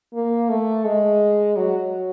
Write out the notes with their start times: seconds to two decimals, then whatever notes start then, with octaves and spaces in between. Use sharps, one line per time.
0.14 A#3
0.49 A3
0.85 G#3
1.56 F#3